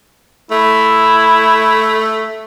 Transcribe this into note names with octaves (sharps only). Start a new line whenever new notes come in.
A3 E4